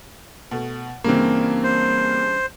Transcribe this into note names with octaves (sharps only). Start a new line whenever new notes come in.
B2 A3
G2 C#3 E3 A#3 C4
C5